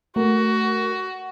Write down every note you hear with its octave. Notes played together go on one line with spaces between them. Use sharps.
A3 F#4 A#4